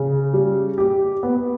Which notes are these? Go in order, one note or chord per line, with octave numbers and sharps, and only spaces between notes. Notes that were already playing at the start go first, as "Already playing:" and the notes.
Already playing: C#3
G3
G4
B3